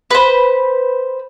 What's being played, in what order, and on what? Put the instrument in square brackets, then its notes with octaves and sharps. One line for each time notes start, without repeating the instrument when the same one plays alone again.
[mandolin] B4 C5